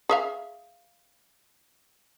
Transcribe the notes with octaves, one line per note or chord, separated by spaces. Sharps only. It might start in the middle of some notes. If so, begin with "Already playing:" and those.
G#4 E5 F5